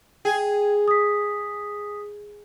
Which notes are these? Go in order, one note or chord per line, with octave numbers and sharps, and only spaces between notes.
G#4 G5
D#6 B6